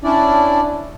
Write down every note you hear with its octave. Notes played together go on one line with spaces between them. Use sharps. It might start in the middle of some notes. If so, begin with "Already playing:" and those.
C#4 D4 E4 D5